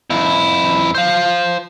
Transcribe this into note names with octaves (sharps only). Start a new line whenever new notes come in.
F2 E4
C5 F5